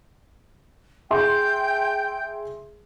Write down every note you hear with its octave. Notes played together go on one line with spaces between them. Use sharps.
G#4 E5 G5 C6